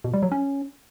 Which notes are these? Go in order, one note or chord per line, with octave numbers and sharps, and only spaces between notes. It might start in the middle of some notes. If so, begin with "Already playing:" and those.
B2
G3
F#3
C#4